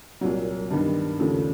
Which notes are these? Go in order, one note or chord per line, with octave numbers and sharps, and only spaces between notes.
C2 A#2 F#3
G2 D#3 G3 B3
D#2 C#3 F3 A3